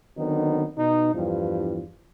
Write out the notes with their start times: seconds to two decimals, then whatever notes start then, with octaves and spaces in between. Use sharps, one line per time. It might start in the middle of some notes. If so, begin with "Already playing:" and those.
0.17 D3 D#3 F#3 B3 C4 D#4
0.77 B2 D#4
1.14 E2 G2 F3